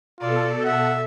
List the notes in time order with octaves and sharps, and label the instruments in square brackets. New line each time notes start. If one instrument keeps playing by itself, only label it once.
[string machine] B2 A4 [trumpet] F4 [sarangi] D5
[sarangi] E5 [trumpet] F#5